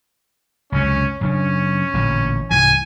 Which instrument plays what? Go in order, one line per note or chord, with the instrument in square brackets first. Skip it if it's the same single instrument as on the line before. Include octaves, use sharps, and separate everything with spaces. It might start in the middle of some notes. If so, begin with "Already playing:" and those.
[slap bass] C#2 F#2 C3 [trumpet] C#4
[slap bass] F#2 C#3 D4 [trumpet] C#4
[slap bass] A1 A#2 D3
[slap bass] C2 G#2 E3 [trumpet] G#5